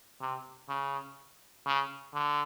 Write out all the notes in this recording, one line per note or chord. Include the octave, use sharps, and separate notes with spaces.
C3
C#3
C#3
D3